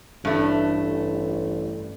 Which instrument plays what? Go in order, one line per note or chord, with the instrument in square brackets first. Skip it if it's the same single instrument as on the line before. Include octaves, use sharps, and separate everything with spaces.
[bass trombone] A1 [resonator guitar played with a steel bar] G2 A3